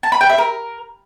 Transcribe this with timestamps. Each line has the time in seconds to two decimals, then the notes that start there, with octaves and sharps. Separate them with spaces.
0.03 A5
0.12 B5
0.21 G5
0.30 E5
0.38 A#4